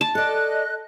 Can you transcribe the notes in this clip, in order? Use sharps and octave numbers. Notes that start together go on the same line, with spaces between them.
A5
A4 D5 D#5 F#6